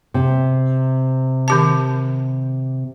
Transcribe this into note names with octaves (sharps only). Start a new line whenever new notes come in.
C3
D#3 G4 A5